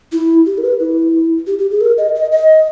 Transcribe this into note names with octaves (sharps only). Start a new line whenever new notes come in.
E4
G4
A#4
B4
E4
G4
G4
G#4
A#4
D#5
D#5
D#5